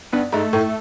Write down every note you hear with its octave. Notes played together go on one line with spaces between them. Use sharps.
G2 B3
G#2 A3
A2